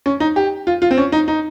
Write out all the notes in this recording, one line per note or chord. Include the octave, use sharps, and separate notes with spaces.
C#4
D#4
G4
F4
F4
C4
C#4
D#4
D#4